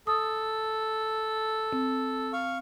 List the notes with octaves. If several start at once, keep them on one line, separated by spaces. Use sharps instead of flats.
A4 D#6
C4
F5 C#6